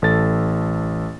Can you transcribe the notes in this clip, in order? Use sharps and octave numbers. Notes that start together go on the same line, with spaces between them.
A1 A4 A6